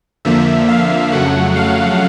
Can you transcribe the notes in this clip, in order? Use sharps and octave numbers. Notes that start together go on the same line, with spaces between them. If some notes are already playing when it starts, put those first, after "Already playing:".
F2 D3 F3 A#3 E5
F5
F2 C#3 F#3 A3 F#5
F5